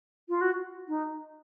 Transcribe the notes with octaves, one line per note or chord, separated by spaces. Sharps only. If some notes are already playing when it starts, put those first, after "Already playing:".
F4
F#4
D#4